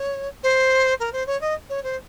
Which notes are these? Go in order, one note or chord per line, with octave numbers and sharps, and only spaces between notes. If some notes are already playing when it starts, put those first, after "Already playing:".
Already playing: C#5
C5
A#4
C5
C#5
D#5
C#5
C5